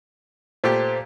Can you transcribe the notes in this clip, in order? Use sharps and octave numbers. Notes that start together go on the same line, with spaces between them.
A#2 A3 G4 C5